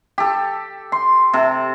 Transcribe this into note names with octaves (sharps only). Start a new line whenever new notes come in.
G4 A4
C6
C3 A4